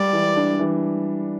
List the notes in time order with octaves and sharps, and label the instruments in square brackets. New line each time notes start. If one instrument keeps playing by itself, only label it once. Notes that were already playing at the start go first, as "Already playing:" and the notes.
Already playing: [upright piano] G3 [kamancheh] D5
[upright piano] E3
D4
E3